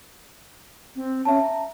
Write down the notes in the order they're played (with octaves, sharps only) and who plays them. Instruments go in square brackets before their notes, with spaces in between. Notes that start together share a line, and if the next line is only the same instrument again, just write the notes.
[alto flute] C4
[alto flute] C#4 [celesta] E5 A5
[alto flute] A#5